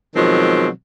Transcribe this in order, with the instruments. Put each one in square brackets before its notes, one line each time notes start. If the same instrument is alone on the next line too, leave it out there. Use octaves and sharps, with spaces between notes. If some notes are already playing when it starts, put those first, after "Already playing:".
[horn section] B2 D#3 F3 F#3 G#3 C4